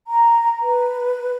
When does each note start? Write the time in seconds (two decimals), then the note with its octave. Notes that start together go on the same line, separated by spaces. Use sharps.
0.07 A#5
0.62 B4